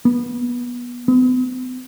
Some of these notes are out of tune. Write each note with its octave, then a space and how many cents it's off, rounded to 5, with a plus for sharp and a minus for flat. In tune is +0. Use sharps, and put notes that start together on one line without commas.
B3 -20
B3 +45